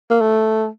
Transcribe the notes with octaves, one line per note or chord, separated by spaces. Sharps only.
A#3
A3